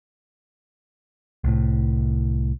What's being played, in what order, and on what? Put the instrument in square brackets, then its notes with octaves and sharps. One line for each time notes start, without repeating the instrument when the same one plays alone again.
[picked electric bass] C2 A2